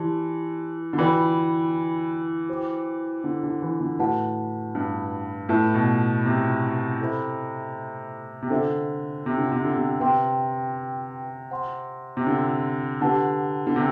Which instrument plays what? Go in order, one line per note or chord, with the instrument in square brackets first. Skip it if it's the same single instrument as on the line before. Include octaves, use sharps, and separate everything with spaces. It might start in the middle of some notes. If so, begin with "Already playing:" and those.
Already playing: [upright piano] E3 [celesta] G4 D5 A5 C6
[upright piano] D3
[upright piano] E3 [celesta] F#4 B4 D5 G5 B5
[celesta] F#4 C5 G5 D6
[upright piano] D3
D3
E3
D3
[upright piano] A2 [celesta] F#4 B4 F#5 A5
[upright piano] G2
[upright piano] A2 [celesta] E4 B4 E5 A5
[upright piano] B2
C3
[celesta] E4 A4 C5 E5 B5
[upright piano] C3
[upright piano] D3 [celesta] A4 C5 E5
[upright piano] C3
D3
C3
D3
C3
[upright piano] C3 [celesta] B4 E5 G5 C6
[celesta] C5 F#5 C6
[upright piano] C3
D3
[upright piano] D3 [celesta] G4 B4 F#5 A5
[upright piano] D3
C3